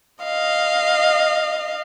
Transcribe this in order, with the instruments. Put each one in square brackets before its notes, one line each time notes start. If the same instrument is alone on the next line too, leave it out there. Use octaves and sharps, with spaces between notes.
[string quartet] D#5 F5